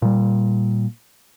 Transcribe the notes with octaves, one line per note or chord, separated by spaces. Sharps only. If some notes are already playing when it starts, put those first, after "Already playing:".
A#2 G3